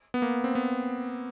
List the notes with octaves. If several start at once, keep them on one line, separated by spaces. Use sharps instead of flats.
B3
A#3
C4
B3